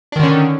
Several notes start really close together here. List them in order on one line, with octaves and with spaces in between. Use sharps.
D4 D#3 D3 C#4